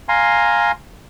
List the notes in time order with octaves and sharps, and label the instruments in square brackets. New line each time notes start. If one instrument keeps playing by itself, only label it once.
[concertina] F5 G#5 A#5 C6